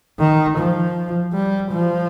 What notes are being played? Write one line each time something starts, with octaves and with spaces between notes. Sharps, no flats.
D#3
F3
G3
F3